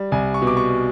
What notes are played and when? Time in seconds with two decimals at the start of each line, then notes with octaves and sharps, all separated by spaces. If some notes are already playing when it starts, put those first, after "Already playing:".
Already playing: G3
0.12 C2 G#5
0.34 C#6
0.42 B2
0.47 D6
0.57 C#6